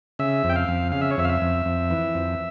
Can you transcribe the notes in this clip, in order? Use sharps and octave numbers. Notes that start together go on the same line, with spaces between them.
C#3 E5
F2
G5
F5
F2
C#3 F5
E5
C#5
F2 E5
F5
E5
F2
F2
E3
F2